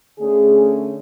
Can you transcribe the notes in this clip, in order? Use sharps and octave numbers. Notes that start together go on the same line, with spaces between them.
D3 A3 C#4 G#4